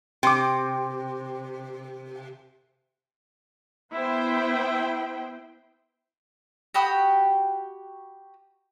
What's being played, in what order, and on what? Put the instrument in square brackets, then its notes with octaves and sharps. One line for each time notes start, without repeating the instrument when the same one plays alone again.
[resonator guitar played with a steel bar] C3 [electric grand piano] G5 C6 D6
[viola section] B3 E4 C5 G5
[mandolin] F#4 G4 B5 D#6